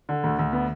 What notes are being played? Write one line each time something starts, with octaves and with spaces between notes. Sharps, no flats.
D3
D2
D2
B3